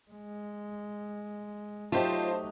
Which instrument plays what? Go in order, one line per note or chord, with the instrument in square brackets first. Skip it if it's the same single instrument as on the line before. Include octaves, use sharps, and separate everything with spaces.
[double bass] G#3
[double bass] F#3 D#4 [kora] A3 G4 [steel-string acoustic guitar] F4 [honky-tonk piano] C5 D#5 A5